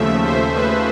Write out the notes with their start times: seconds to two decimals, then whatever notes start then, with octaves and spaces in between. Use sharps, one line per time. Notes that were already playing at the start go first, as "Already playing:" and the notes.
Already playing: D#2 C#3 F3 A3 E5
0.23 C5
0.54 B4